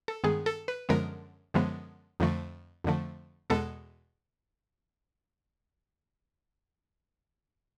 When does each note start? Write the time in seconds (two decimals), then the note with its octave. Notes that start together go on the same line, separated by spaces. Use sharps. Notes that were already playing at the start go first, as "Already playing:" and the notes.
0.08 A4
0.24 G2 D#3 G#3 B3 G#4
0.46 A4
0.68 B4
0.89 F#2 D3 F3 G#3 B3 A#4
1.54 F#2 D3 F3 G#3 B3
2.20 F2 D3 F3 A3
2.84 F2 D3 F3 A3
3.50 E2 B2 G#3 B3 A4